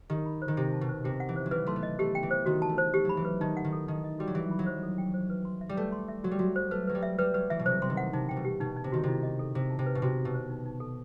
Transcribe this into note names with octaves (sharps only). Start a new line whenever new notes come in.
D#3 G4
B5
C5
D#3
C3 G4
A5
B2
C5
C3 G4
F#5
E3
C5
F#3
E3 B4
A3 C6
B3
D#5
A3 G4
G5
E3
C5
D#3 F#4
A5
A3
C5
A3 G4
F#3 B5
E3
B4
D#3 D#4
F#5
D#3
A4
D#3 D#4
D#5
G3 F#4
F#3
E3 G4
B5
F#3
C5
A4
G5
C5
B4
C6
E5
G3
A3 B4
C6
E5
F#3 F#4
G3
F#3 F#4
C5
A3 B4
F#3 B4
G3
E5
G3 B4
F#3 B4
E3 E5
B2
C3 C5
C3 C6
D#3
F#5
C3 D#4
C3 G5
B2
G4
B2 D#4
D#4
C3
D#3 F#4
C3 E4
D#5
A4
C3 G4
A5
C3
B4
B2
C3 F#4
F#4
B2
C5
D#4
D#4
A4